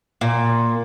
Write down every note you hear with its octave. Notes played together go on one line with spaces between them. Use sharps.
A#2